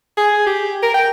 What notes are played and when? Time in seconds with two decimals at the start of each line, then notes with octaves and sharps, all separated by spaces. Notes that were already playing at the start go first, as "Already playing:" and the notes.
0.17 G#4
0.47 G4
0.83 A#4
0.94 G5